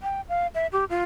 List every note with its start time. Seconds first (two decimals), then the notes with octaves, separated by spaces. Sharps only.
0.03 G5
0.29 F5
0.55 E5
0.72 G4
0.90 F4